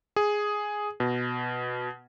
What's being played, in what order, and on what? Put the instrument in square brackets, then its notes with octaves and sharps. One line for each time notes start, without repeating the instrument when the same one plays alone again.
[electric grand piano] G#4
B2